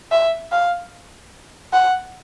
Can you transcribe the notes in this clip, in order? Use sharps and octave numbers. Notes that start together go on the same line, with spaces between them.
E5
F5
F#5